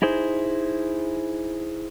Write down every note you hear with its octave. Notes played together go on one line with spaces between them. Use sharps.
D#4 E4 G#4 C5